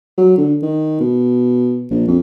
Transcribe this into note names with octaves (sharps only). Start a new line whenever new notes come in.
F#3
D3
D#3
B2
A#1
F2